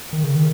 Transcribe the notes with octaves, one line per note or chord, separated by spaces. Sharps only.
D#3
C#3
D#3